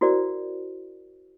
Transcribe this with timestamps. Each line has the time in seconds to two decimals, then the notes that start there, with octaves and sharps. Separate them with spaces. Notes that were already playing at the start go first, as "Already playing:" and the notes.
0.01 E4 F#4 A#4 C5 D5